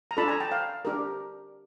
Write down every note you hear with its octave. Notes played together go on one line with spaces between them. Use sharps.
A#5
D4 F4 A4 A5 B5
G#5 A#5
G5 A5
F5 G5
D4 G4 A#4